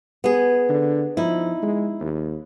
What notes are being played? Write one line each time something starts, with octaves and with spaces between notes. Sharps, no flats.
B3 G#4
D3
F3 D#4 E4
G#3
D#2